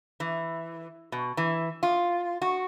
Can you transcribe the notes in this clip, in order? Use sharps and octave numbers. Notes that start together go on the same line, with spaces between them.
E3
B2
E3
F4
F#4